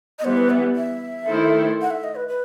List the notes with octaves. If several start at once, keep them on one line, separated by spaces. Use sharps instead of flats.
D#5
E3 G3 B3 C5
B4
E5
E5
D#3 A3 E4 A4 C5
F#5
E5
D#5
B4
B4